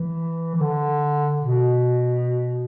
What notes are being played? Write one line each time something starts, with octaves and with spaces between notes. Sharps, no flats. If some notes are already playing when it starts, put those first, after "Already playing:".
Already playing: E3
E3
D3
B2